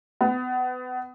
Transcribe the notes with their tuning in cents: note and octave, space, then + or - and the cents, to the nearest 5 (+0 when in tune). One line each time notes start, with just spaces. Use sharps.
B3 +30